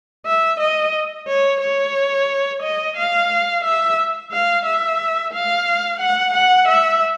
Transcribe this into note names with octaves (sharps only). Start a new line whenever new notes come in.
E5
D#5
C#5
C#5
D#5
F5
E5
F5
E5
F5
F#5
F#5
E5